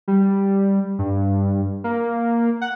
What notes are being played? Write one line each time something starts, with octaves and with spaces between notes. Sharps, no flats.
G3
G2
A#3
F#5